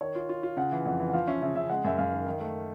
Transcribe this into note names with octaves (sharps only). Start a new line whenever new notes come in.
D#3 C#5
F4
F4
F4
C#3 F#5
E3
F2 F#5
E3
F#5
F3 F5
C#4 E5
C#3 E5
C#3 E5
G#3 F#5
F#2 E5
F#2 F5
D#3
D#3
A3